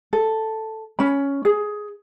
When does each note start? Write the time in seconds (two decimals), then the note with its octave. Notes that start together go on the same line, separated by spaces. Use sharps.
0.13 A4
0.99 C#4 B5
1.45 G#4